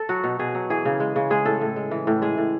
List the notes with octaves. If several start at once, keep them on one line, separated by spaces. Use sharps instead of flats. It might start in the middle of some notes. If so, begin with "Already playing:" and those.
Already playing: A4
F#3 F#4
B2
B2 G#4
F#3
E3 G#4
C#3
G#3
C#3
G#3 G#4
A2 A4
A2
G#3
E3
A2
G#3 G#4
A2